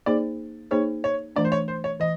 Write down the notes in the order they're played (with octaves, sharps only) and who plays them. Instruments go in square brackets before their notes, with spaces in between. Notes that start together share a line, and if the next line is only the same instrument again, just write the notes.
[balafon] A#3 D#4 G#4 C5 [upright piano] D5
[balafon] A#3 D#4 G#4 C5 [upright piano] C#5
[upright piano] C#5
[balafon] E3 A3 D4 [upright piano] D5
[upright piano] C5
C#5
C5
C#5
[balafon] E3 [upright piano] D#5